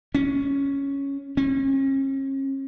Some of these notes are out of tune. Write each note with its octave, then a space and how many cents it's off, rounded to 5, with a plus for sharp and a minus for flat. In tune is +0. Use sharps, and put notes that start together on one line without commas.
C#4 +0
C#4 -40